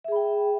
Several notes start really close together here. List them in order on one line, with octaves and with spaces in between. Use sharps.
E5 G#4 B5 G5